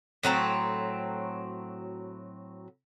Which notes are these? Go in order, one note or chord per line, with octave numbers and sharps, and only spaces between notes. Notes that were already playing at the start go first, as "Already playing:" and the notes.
A2 F#3 C4 A#5